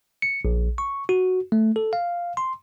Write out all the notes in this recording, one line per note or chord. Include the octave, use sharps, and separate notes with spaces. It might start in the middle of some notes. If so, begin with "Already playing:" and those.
C#7
A#1
C#6
F#4
A3
A4
F5
C6